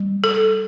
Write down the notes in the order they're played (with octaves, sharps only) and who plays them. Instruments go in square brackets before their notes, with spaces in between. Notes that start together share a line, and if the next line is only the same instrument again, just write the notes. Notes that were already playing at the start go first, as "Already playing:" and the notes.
Already playing: [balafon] G3
A4